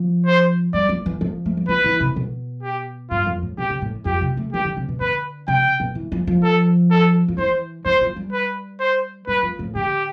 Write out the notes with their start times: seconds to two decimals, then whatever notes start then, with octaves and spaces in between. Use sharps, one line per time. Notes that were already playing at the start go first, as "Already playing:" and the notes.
Already playing: F3
0.26 C5
0.74 G3 D5
0.89 F3
1.06 E3
1.21 F3
1.46 A3
1.57 G3
1.69 F3 B4
1.84 E3
2.00 C3
2.16 B2
2.63 G4
3.10 G2 F4
3.27 F2
3.42 A2
3.58 B2 G4
3.70 C3
3.82 A2
4.05 F2 G4
4.21 C3
4.37 A3
4.53 E3 G4
4.65 D3
4.77 C3
4.88 B2
5.01 D3 B4
5.48 C3 G5
5.80 B2
5.95 E3
6.12 F3
6.27 F3
6.43 A4
6.91 A4
7.28 F3
7.38 E3 C5
7.85 E3 C5
8.01 F3
8.16 G3
8.32 B4
8.80 C5
9.27 G3 B4
9.43 F3
9.59 A2
9.75 D3 G4